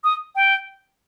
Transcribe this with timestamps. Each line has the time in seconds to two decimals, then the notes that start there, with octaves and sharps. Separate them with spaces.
0.04 D#6
0.36 G5